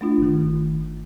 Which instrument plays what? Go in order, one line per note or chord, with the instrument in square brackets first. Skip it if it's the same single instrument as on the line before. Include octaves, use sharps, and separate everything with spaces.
[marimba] A3 D4 F4
[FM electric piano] G1 D#3